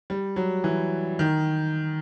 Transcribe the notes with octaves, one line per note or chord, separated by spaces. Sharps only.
G3
F#3
E3
D#3